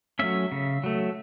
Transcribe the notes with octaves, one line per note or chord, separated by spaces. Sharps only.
F#3 A3 C#4 E5
C#3
F#3 A3